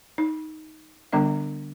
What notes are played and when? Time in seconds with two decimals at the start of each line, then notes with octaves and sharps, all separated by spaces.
0.18 D#4
1.13 D3 G3 B3 D4 E5